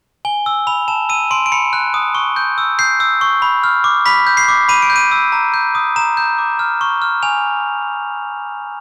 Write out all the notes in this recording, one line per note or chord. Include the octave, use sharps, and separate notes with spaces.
G#5 G7
E6
B5 F7
A5 E7
E6 D#7
C6 D7
D7
B5 C#7
F#6
D#6
C#6
G6
E6
G6 C7
E6
C#6
B5
F6
D6
B5 B6
G6
C7
D6
B5 D#7
D7
G6
D#7
E6
A#5
G6
D#6
A#5 E7
G6
D6
F6
C#6
F6
G#5 F7